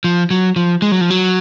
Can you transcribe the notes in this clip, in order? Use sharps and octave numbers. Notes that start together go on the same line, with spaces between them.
F3
F#3
F3
G#3
F#3
F3
F#3